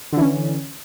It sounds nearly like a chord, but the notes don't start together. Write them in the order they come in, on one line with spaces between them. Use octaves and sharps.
D3 E3 C#4